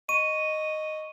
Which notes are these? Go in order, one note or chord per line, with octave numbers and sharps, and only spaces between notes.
D#5 C#6 D#7